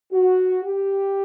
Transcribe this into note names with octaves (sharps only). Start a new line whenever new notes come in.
F#4
G4